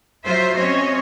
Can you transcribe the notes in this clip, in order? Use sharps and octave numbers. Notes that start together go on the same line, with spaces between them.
F#3 F4 C5 E5
C4 C#4 C#5 D#5